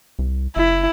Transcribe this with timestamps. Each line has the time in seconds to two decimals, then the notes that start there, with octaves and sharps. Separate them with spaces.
0.19 C2
0.56 F#1 E4